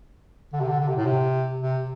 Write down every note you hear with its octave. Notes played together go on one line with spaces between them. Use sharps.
D3
C3
D3
D3
C3
A2
C3
C3